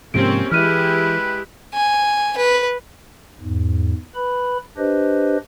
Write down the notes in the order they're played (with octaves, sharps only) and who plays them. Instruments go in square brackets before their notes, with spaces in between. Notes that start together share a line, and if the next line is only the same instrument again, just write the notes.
[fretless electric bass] G#2 C3 F3 [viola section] A#3 C4 C#4 [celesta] G4 D7
[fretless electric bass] E3 [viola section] G#3 E4 G4 [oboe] B4 [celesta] F6 D#7
[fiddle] G#5
B4
[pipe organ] E2 G#2
B4 B5
D4 G4 B4 C5 D#5